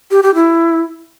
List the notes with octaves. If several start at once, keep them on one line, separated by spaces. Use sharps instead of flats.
G4
G4
E4